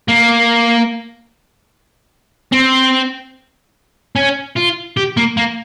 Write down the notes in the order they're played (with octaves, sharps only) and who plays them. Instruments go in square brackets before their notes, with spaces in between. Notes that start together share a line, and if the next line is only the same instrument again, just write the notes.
[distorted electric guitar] A#3
C4
C#4
F4
G4
A#3
A#3